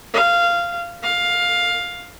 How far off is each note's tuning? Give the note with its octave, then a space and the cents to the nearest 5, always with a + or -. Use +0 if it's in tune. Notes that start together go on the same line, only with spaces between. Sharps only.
F5 -15
F5 +10